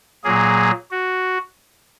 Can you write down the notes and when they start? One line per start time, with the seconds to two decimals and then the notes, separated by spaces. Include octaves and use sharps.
0.24 A#2 F#3 A#3 G#4
0.91 F#4